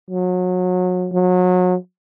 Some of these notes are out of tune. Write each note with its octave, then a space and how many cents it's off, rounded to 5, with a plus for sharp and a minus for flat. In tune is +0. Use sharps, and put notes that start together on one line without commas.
F#3 -30
F#3 -30